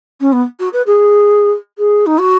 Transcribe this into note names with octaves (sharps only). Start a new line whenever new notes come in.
C#4
B3
F#4
B4
G#4
G#4
D#4
F#4